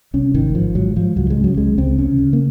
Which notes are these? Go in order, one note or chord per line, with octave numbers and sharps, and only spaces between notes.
C2 C#4
G#1 D#3
G#1 F3
G#2 F#3
G#2 F3
C#2 F#3
G#3
C#3
F#3
C#2 G#3
C#2 C4
C#3 C#4
C#3
A#3